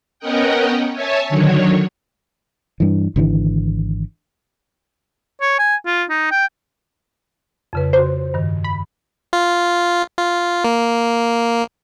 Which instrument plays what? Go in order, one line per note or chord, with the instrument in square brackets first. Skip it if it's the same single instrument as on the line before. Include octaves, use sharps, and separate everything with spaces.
[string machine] B3 C#4 A#4 D#5 F#5 G5
C#5 E5 G#5 A5
D3 D#3 F#3 C#5
[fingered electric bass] G2 E3
G#1 D3 E3
[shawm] C#5
G#5
F4
D#4
G5
[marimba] F2 C#3 B4
[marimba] C#3 F#4 [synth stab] C5
[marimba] G2 D#3
[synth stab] B5
[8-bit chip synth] F4
F4
A#3